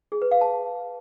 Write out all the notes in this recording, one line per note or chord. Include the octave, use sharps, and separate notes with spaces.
G#4
B4
F5
A5